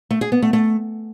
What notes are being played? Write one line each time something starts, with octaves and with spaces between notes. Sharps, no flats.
A3
G#4
B3
A3
A3